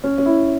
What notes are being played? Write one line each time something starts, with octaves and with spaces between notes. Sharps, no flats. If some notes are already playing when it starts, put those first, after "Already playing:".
C#4
C#4
E4